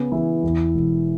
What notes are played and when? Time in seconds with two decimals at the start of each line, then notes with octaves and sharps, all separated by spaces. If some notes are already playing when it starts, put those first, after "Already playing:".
Already playing: C#3 B3 C#4
0.12 E3 E4
0.43 E2
0.75 E1